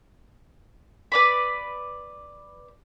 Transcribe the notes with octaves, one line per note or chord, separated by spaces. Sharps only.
B4 D5 B5